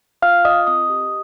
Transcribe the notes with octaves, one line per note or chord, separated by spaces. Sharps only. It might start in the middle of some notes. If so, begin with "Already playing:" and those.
F4 F5 F6
F4 D#5 D#6
C4 D#5 D#6
G4